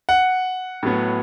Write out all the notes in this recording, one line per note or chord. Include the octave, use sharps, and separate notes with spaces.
F#5
A2 F#3 B3